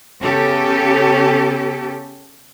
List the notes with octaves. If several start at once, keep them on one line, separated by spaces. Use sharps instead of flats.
C#3 B3 C#4 G4 A4